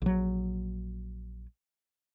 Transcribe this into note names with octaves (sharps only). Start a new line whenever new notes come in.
A#1 F#3